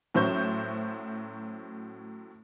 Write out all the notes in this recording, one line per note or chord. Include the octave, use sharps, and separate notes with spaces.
A2 F#3 C#4 C5 C#6 G6